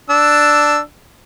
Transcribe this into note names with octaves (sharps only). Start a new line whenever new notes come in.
D4 E6